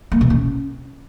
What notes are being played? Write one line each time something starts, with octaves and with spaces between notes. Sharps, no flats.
A#3
B2
C#4